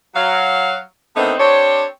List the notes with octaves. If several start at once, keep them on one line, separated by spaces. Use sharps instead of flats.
F#3 F5
D3 D#3 A3 B3 C4 D#4
C4 D4 G4 C5 C#5